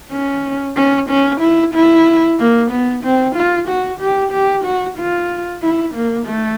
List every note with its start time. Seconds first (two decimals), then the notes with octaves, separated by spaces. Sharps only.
0.12 C#4
0.76 C#4
1.09 C#4
1.41 E4
1.75 E4
2.39 A#3
2.71 B3
3.04 C4
3.36 F4
3.68 F#4
4.00 G4
4.32 G4
4.64 F#4
4.98 F4
5.62 E4
5.95 A#3
6.26 A3